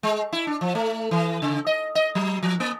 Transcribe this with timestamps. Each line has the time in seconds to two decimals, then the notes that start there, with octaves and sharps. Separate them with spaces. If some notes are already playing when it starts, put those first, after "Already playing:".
0.03 G#3
0.33 E4
0.47 D4
0.61 F3
0.75 A3
1.11 E3
1.42 C#3
1.67 D#5
1.95 D#5
2.15 F#3
2.43 F3
2.60 A#3